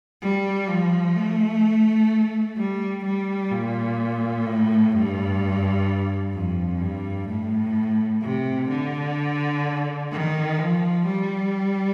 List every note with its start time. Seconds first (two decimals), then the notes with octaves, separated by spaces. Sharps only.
0.22 G3
0.68 F3
1.15 A3
2.57 G3
3.04 G3
3.51 A#2
4.45 A2
4.93 G2
6.33 F2
6.81 G2
7.28 A2
8.22 C3
8.69 D3
10.12 D#3
10.59 F3
11.06 G3